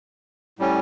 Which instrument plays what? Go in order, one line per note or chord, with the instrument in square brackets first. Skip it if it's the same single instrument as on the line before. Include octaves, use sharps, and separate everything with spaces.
[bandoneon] A2 G3 C#4